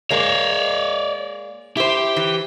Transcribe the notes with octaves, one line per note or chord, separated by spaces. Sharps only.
G#3 A#3 C#5 D5
E4 G4 C5
E3